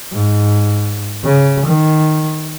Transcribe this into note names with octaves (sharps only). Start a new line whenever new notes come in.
G#2
C#3
D#3